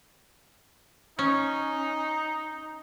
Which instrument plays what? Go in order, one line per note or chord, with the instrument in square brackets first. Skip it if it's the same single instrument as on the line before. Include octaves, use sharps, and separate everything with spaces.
[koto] C#4 [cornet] D#4